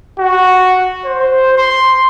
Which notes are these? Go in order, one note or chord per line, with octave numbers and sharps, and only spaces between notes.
F#4
C5
C6